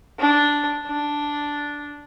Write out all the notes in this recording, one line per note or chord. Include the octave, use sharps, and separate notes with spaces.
D4
D4